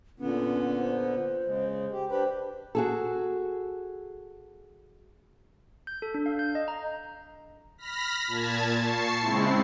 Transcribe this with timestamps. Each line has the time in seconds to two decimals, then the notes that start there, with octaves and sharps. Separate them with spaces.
0.20 A#2 D3 B3 C#4
0.78 C5
1.45 C#3 G#3
1.92 G4
2.10 D4 G4 B4 C5
2.75 F#4 G#4 A4
5.87 G6
6.02 A4
6.14 D4
6.26 F5
6.39 G6
6.55 D#5
6.68 A#5
7.78 B5 F6 A#6 B6
8.27 A#2 A5 G#6
8.81 A5 C#6 C7
9.20 C#3 G#3 C4 E4